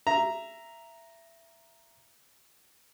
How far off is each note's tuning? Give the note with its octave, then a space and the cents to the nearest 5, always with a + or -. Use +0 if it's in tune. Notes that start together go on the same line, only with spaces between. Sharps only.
E5 +20 A#5 +0